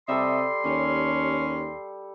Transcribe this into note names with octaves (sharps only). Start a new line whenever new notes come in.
C3 G3 A4 D#5 E5 C6
D#2 C#4